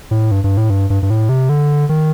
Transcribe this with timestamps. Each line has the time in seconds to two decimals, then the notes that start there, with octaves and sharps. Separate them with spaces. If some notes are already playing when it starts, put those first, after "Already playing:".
0.11 A2
0.31 G2
0.44 G2
0.57 A2
0.70 G2
0.90 G2
1.03 G2
1.10 A2
1.29 C3
1.49 D3
1.89 D#3